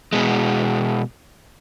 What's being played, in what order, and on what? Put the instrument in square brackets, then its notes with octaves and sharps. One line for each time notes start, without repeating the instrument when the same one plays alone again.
[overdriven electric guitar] B2 G#3